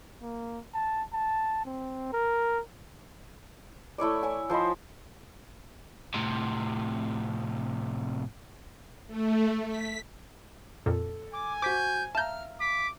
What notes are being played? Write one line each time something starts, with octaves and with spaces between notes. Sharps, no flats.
A#3
A5
A5
C4
A#4
A3 E4 C#5 D5
C#5 G#5
F3 C5 D#5 B5
A2 C3
A3
B6
F2 A#2 A4
G#5 D6
F#4 C5 D6 G6 B6
E5 F5 A5 A#5 F6 G6
D6 B6